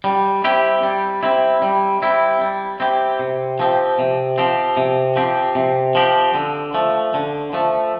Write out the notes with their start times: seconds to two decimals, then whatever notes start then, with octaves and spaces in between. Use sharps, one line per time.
0.04 G3
0.44 C4 E4 G4
0.83 G3
1.23 C4 E4 G4
1.62 G3
2.02 C4 E4 G4
2.41 G3
2.80 C4 E4 G4
3.19 C3
3.60 F3 C4 G4
3.99 C3
4.38 F3 C4 G4
4.77 C3
5.16 F3 C4 G4
5.55 C3
5.95 F3 C4 G4
6.35 D3
6.74 F3 A3
7.14 D3
7.53 F3 A3